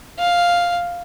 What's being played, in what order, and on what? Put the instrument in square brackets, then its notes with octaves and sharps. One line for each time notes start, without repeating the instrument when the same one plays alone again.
[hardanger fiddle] F5